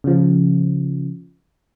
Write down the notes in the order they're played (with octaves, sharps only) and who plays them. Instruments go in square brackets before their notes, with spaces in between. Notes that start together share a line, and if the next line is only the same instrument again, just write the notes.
[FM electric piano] C#3 F3